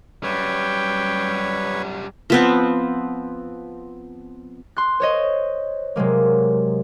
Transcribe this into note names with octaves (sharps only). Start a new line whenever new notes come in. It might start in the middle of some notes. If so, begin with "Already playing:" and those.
F#2 G3 B4 C#5 G5
F3 B3 C4
C6 F#6
C5 C#5 D#5
C3 F#3 G#3 A#3